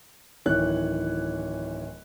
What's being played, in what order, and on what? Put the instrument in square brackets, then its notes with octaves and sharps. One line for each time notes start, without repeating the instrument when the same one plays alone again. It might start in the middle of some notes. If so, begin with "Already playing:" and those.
[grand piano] D1 D#3 E3 C#5 F#6